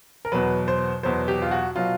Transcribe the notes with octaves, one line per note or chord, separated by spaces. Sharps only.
A#4
E2 B2 F#3 B4
C5
E2 B2 F#3 C5
G4
F4
F#4
B2 F#3 F4